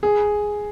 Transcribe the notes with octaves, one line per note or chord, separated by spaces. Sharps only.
G#4